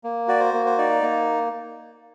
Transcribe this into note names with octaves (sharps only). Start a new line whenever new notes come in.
A#3
F#4 D5
C5
A#3
C5
D#4 D5
A#3